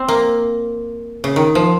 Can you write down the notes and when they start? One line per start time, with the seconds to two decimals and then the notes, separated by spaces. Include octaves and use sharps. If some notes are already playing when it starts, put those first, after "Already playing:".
Already playing: C4
0.08 A#3
1.24 C#3
1.36 D#3
1.55 F3